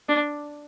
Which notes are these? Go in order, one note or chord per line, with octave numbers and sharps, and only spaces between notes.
D4